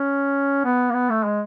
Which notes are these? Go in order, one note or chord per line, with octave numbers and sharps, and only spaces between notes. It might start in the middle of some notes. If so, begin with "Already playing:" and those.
Already playing: C#4
B3
A#3
B3
A3
G#3